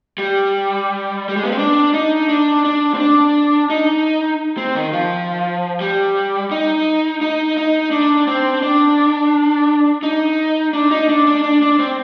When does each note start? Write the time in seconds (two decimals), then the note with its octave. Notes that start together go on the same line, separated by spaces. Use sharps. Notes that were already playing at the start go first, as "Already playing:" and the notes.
0.18 G3
1.29 G3
1.37 G#3
1.43 B3
1.52 C4
1.58 D4
1.94 D#4
2.29 D4
2.65 D4
2.94 C4
3.00 D4
3.70 D#4
4.58 C4
4.75 D#3
4.93 F3
5.81 G3
6.51 D#4
7.21 D#4
7.57 D#4
7.91 D4
8.27 C4
8.62 D4
10.03 D#4
10.73 D4
10.91 D#4
11.09 D4
11.26 D4
11.43 D4
11.62 D4
11.79 C4